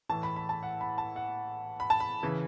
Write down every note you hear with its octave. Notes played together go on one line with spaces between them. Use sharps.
A2 E3 A5
B5
B5
A5
F#5
B5
A5
F#5
B5
A5
B5
C#3 E3